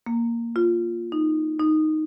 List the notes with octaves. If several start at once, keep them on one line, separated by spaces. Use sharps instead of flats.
A#3
F4
D#4
D#4